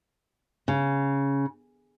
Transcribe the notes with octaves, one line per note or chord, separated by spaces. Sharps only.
C#3